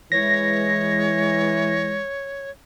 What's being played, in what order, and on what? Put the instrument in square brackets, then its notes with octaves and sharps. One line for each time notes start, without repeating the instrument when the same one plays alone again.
[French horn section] E3 [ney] G#3 [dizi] C#5 [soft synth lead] A#6